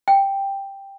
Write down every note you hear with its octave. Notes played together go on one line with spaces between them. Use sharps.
G5